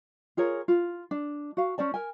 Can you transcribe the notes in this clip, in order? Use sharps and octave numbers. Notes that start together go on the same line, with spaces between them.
F4 G#4 A#4 C#5
F4
D4
F#4 F5
C#4 C5 D5 A5
A#4 G#5